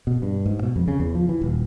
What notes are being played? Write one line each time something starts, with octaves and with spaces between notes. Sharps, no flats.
B2
G2
G#2
B2
F2
C#3
E2
F3
E3
D#1